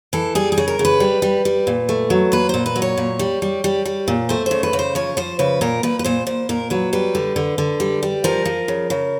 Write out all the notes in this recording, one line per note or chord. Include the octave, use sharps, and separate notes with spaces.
E3 A4
G3 G#4
G#4
C#3
A#4
C#3
B4
G3
G3
G3
A#2
A3
F#3
A#2 B4
A#2 C5
B4
F#3
C#5
A#2
G3
G3
G3
G3
A#2
A3 C5
C#3 C5
B4
C#3
C5
F3 C#5
F3 C5
C#3 B4
A#2 A#4
A#2 B4
B4
A#2 C5
A#2 C5
A#2 A#4
F#3 B4
G3 B4
D3
D3
D3
G3
G3
F3 A#4
F3
C#3
C#3